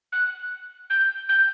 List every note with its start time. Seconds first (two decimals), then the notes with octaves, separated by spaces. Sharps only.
0.12 F#6
0.90 G6
1.29 G6